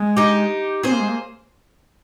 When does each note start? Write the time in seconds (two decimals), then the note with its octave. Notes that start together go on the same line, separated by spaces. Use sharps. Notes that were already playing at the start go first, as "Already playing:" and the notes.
Already playing: G#3
0.17 D#4 G4
0.83 C4 G#4 C5
0.92 A#3
1.00 G#3
1.08 A#3